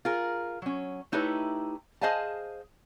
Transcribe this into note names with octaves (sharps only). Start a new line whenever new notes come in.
F4 G#4 A#4
F#3 C#4
A3 D#4 E4 G4 B4 C#5
G#4 C5 D#5 F5 G#5 A5